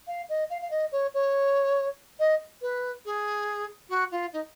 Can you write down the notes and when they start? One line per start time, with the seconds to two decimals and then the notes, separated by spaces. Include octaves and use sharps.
0.06 F5
0.29 D#5
0.49 F5
0.61 F5
0.70 D#5
0.92 C#5
1.14 C#5
2.19 D#5
2.61 B4
3.05 G#4
3.89 F#4
4.11 F4
4.33 D#4